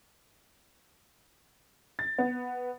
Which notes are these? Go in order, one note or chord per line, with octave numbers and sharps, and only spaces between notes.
A6
B3